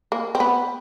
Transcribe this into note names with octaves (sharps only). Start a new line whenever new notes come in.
A#3
C4
B3